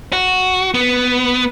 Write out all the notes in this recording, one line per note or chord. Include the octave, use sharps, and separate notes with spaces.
F#4
B3